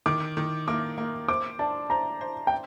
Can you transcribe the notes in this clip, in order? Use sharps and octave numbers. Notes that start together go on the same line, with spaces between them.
D#3 D6
D#3
A#3 D6
A#3
C5 D6
D4 A5
C5 A#5
C5
G5